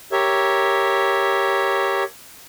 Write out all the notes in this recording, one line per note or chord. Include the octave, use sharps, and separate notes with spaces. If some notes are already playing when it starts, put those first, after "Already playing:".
G4 A#4 C#5 E5